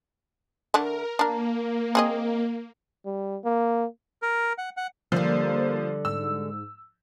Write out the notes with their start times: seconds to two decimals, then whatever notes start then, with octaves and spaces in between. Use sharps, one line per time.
0.74 D3 A3 D4 A#4
1.19 A#3 D4 A#4
1.95 C4 G#4 D#5
3.05 G3
3.45 A#3
4.22 A#4
4.58 F#5
4.77 F#5
5.12 D3 F3 G3 A#3 C5
6.05 G#2 E6